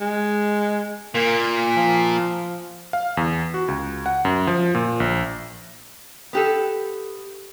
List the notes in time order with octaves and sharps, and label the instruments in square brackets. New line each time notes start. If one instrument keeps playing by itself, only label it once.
[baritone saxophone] G#3
[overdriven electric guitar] A#2 [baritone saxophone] A#3
[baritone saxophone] F3
[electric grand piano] F5
E2
F#4
C#2
F#5
F#2
F3
A#2
A#1
[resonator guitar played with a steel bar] B3 G4 A4